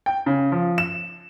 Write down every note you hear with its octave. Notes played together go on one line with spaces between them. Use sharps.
G5
C#3
F3
E7